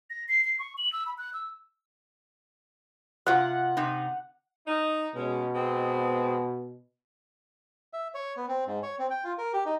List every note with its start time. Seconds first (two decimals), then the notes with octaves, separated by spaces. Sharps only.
0.10 A#6
0.28 C7
0.44 C7
0.59 C#6
0.78 F#7
0.93 E6
1.06 B5
1.18 F#6
1.33 E6
3.26 C3 F4 F#5
3.77 C3 D#4
4.67 D#4
5.16 B2 G#3 C#4
5.55 G#3 B3 C4
7.93 E5
8.14 C#5
8.37 B3
8.48 C4
8.67 G#2
8.83 C#5
8.99 C4
9.10 G5
9.24 F4
9.38 A#4
9.53 G4
9.66 D#4